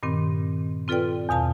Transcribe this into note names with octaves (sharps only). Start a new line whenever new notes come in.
G2 A#2 D#3 C4
C4 F4 A4 B4 D5 G5
E2 B2 F5 A5